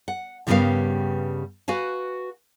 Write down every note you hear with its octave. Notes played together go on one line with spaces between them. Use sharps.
F#5
G2 C#3 G3 B3 A#4 F5
F#4 B4 F5 G#5